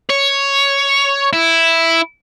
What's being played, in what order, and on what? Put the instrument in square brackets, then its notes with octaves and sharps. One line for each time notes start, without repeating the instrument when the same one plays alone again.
[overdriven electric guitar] C#5
E4